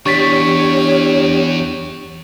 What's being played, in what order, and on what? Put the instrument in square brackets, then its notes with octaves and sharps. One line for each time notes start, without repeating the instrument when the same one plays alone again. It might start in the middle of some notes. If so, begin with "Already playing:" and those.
[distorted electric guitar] E2 [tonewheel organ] D4 G4 [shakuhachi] C#5 [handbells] C#6 A6 B6